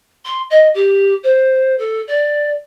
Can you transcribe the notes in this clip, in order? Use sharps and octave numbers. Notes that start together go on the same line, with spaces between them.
C6
D#5
G4
C5
A4
D5